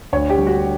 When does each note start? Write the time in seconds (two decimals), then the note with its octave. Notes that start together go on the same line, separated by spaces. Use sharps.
0.13 D2 C#5
0.30 G4
0.38 D3 G3
0.47 F#4